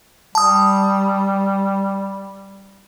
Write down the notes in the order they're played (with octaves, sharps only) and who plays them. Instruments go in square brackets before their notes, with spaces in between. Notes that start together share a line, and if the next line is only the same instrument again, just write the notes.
[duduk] G3 [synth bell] A5 D#6